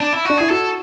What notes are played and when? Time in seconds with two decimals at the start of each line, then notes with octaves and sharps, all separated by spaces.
0.00 D4
0.13 E4
0.25 D4 F#4
0.38 E4 G#4
0.50 F#4 A4